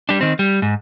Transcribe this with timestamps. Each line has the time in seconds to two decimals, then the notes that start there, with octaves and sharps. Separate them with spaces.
0.09 G3 D4
0.21 D#3 C4
0.39 G3
0.62 G#2